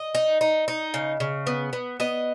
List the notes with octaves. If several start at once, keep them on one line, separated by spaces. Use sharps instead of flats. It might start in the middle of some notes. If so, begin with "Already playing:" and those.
Already playing: D#5
D#4
D#4
D#4
C#3
C#3
B3
B3
B3 D#5